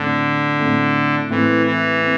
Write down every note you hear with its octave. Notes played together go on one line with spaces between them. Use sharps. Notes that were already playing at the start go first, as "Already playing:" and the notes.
Already playing: A2 D3 A3 C4
A2 A3 C4
A2 E3 A3 C4
E3
A3 C4